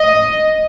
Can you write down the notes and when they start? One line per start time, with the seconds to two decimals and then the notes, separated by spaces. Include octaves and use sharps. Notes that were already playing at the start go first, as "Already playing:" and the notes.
Already playing: D#5